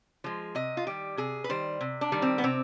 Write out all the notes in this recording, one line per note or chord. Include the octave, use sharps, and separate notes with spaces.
F3 G#3
C3 D#5
F4
D#3 G3 G4
C3 G#4
B4
D#3 G3 C5
C3
D4
D#3 G3
C4
B3
C3 C4